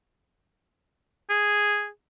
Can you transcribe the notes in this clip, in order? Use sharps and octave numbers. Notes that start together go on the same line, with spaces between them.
G#4